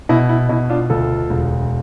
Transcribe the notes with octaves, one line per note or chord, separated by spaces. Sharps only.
B2 E4
E4
B2 E4
D4 F4
D2 F4 A4
E1